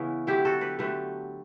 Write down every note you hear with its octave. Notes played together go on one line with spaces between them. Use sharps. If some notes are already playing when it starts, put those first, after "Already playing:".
Already playing: C#3 E3 B3 C#4 E4
D3 F#3 B3 E4 G4
F#4 A4
G4 B4
D3 F#3 A3 G4 B4